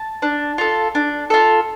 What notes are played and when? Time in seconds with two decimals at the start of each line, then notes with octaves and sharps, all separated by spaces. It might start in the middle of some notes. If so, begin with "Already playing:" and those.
Already playing: A5
0.22 D4
0.58 F4 A4
0.95 D4
1.30 F4 A4